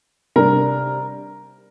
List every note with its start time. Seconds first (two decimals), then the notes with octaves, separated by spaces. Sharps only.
0.36 C3 G3 D4 A#4